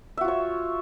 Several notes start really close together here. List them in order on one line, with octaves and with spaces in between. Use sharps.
E5 F#4 F4 C#5